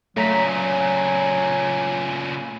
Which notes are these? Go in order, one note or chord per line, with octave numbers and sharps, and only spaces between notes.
A#2 C#3 F#3 A3 A#5 B6